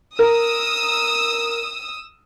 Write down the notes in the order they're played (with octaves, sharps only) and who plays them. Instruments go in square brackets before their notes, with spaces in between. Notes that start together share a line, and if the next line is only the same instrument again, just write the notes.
[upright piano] A#4 [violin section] D#6 E6